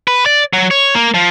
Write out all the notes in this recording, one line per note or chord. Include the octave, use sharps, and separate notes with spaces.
B4
D5
F#3
C#5
A#3
F3